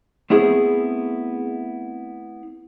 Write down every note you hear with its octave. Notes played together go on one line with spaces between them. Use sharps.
A3 B3 C4 E4 G#4